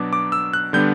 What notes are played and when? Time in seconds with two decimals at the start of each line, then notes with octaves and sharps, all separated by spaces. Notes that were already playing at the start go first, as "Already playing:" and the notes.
Already playing: B2 F#3 B3 D4 D6
0.13 D6
0.32 E6
0.53 F#6
0.73 D3 G3 B3 D4 G6